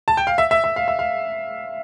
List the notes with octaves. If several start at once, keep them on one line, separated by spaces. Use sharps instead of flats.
A5
G5
F5
E5
E5
E5
F5
E5
F5